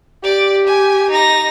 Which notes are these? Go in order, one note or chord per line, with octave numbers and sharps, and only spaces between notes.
G4 D5
G#5
D#4 A#6